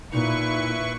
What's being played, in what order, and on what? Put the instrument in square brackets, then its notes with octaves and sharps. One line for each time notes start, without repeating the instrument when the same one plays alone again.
[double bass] A#2 [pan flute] D#4 [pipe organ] E4 B4 C#6